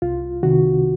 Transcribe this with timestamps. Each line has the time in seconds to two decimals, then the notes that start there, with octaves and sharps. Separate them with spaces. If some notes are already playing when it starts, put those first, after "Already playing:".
0.02 C2 F4
0.43 C3 D#3 F#4